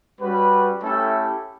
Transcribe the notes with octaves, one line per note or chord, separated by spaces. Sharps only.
G3 C#4 F#4 B4
A3 C#4 E4 G4 A4